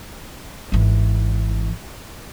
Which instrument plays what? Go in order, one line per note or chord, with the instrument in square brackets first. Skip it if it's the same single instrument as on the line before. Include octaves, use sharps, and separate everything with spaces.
[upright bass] G#1 E3